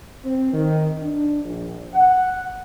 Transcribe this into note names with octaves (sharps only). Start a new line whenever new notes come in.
C4
D#3
D4
A#1
F#5